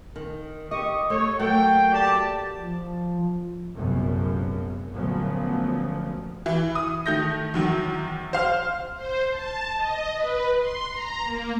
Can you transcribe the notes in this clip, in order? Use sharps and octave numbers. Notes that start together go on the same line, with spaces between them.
D#3
G4 D#5 C#6 D#6
A3 C#5
F#3 A3 A#3 G5
G4 D5 A5
F3
F1 A#1 F#2 A#2 B3
D2 A#2 C#3 F3 F#3 B3
E3
D#6
D#3 A3 G6 A#6
E2 D#3 F#3
C5 F5 F6
C5
A5
D#5
B4
C6
A#5
A#3